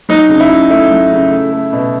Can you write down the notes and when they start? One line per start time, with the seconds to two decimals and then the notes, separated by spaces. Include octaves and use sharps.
0.09 F#3 D#4
0.29 C#3
0.40 E4
0.51 C#3
0.70 A3 E4
0.91 F#3
1.12 C#3
1.31 A3
1.53 A3
1.73 B2